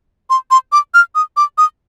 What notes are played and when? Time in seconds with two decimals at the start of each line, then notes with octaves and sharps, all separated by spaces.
0.30 C6
0.51 C6
0.72 D6
0.94 F6
1.15 D#6
1.37 D6
1.58 D#6